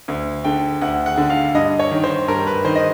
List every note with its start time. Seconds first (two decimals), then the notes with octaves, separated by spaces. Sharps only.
0.08 D2
0.44 D3 G5
0.81 D2 F#5
1.06 F#5
1.18 D3
1.30 F5
1.54 G2 D#5
1.79 C#5
1.91 D#3
2.04 C5
2.28 G2 A#4
2.47 B4
2.65 D#3 C5
2.75 D#5